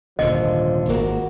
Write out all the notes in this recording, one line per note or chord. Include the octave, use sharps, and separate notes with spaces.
D#1 G#2 D3 F3 D#5
G#1 A#3 F#4